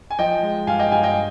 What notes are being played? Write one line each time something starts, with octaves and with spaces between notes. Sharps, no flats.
G#5
F3 D#5 G5
G#3
G2 F5 G#5
D#5 G5
G2 F5 G#5
D#5 G5